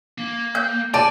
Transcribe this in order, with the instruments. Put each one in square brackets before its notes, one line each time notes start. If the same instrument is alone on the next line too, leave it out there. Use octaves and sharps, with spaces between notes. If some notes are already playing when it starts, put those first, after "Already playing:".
[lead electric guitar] A#3
[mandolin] G6
[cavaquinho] D5 [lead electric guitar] G#5 [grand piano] A5